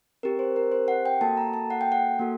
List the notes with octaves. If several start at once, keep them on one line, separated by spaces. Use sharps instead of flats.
C4 G4 A#4
C5
A#4
C5
F#5
G5
A#3 F#4 A4 A5
A#5
A5
F#5
G5
F#5
A#3 F#4 A4